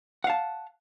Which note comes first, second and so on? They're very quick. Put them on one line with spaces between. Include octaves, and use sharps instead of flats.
F#5 F5 A5